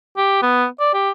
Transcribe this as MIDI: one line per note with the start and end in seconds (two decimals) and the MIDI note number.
0.17 0.39 67
0.42 0.66 59
0.80 0.92 74
0.94 1.10 67